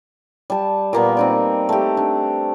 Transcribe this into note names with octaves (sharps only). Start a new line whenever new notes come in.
G3 A5
A#2 A#3 B3
C4 D#4 D5
A3 G4
D4